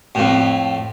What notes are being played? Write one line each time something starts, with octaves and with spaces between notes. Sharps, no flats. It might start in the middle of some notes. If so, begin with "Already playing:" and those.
F2 A2